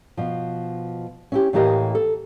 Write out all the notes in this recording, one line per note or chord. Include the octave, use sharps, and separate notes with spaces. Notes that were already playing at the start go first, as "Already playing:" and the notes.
B2 F3
C#4 E4 G4
A2 E3 A#3 G4 D#5
A4